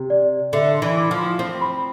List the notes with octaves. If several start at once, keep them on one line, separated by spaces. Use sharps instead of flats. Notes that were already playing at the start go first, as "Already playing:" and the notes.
Already playing: C3
D5
D3 E5
C6
E3
D6
F3
C6
C4
B5